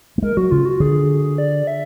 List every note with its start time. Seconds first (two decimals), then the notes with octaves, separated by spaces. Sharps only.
0.18 A3
0.22 G#3 A#4
0.37 F#3 F#4
0.51 C#3 F4
0.66 F#4
0.80 D3 G#4
1.38 D5
1.67 E5